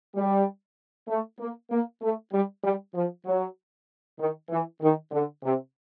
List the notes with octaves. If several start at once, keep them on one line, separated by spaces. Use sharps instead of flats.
G3
A3
A#3
A#3
A3
G3
G3
F3
F#3
D#3
E3
D#3
D3
C3